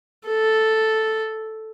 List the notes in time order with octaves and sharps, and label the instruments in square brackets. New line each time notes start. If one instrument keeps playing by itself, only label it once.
[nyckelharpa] A4